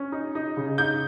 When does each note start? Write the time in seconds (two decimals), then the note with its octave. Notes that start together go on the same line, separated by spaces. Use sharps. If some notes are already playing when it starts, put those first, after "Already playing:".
Already playing: C#4
0.12 D#4
0.35 D#4
0.57 C#3
0.78 D#4 G6